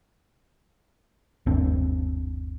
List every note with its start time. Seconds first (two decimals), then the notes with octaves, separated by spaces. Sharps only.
1.46 G1 D#2 C4 D4